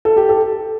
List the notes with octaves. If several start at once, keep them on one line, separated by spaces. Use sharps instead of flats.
A4
G4
A4